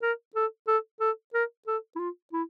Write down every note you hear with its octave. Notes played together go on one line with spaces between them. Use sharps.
A#4
A4
A4
A4
A#4
A4
E4
F4
E4